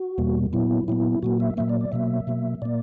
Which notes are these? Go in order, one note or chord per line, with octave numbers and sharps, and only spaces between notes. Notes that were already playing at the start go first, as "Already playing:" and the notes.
Already playing: F#4
E2 B2 G3 A#3
A#2 F#3 B3 E4
A#2 F#3 B3 E4
A#2 F#3 A#3 F#4
E5
A#2 F#3 A#3 E5
D5
D5
B2 F#3 A#3 E5
B2 F#3 A#3
A#2 A#3 D5